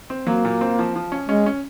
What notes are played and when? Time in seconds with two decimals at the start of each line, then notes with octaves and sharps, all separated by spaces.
0.10 C4
0.27 F#3 A#3
0.45 A#2
0.61 C4
0.79 F3
0.96 F3
1.12 C#4
1.29 G#3 C#4
1.46 C#4